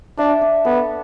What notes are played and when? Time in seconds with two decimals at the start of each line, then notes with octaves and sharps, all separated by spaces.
0.18 D4 E5
0.41 D4
0.65 B3 A4